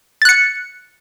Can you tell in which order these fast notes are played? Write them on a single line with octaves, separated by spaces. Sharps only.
A6 F#6 C#7